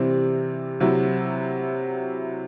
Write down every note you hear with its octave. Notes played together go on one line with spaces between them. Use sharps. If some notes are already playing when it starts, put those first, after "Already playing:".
Already playing: C3 E3 G3 C4
C3 F#3 C4 E4